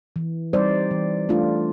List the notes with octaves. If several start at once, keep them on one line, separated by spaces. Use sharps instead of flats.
E3
G3 C4 D#4 C5 D5
E3
A3 D4 F4